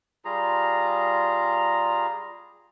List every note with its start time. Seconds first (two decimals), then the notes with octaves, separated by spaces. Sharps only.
0.25 G3 F4 G#4 A#5